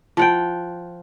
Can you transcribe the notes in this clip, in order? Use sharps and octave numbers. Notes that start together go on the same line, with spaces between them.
F3 F#5 G5